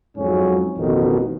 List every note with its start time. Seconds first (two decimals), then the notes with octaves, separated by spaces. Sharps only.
0.16 F2 G#2 F#3 C#4
0.77 A1 F2 B2 D#3